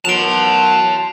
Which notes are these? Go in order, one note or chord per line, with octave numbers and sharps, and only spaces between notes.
B2 D#3 F#3 A5 C6 D7 F7